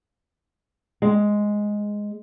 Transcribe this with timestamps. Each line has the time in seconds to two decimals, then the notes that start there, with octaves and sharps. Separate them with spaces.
1.02 G#3